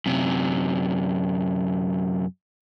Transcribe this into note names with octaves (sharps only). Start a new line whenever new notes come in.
F#2 C3